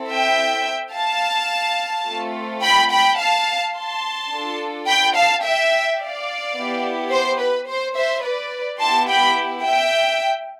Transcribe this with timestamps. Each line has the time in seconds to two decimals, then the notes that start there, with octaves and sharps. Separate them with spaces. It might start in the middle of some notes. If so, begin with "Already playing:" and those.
Already playing: C4 E4 A4
0.10 E5 G5
0.94 F5 A5
2.07 A3 C4 F4 A4
2.62 G5 B5
2.91 G5 B5
3.19 F5 A5
3.75 A5 C6
4.31 D4 F4 A4
4.87 G5 B5
5.15 F5 A5
5.44 E5 G5
5.99 D5 F5
6.56 B3 E4 G4
7.12 C5
7.40 B4
7.68 C5
7.96 C5 E5
8.24 B4 D5
8.79 B3 E4 G4 A5 C6
9.08 G5 B5
9.64 E5 G5